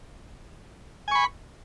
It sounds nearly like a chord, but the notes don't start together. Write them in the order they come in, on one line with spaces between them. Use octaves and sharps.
G#5 C#6 B5